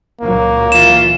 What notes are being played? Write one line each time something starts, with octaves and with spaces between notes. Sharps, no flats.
C#2 A#2 F#3 A#3
E3 F4 E7